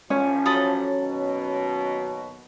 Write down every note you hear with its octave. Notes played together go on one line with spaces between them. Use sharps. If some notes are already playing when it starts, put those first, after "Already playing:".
A1 F3 C#4
F#3 A4 B5 D#6
D#2 B2